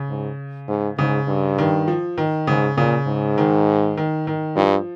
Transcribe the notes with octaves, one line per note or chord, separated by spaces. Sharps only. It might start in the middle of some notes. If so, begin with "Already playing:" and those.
Already playing: C#3
G#2
G#2
G#2 C#3
G2
D#3
F3
D#3
G#2 C#3
A#2 C#3
G#2
D#3
D#3
D#3
G2 F3